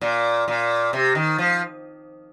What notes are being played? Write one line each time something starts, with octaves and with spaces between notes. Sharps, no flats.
A#2
A#2
C3
D#3
F3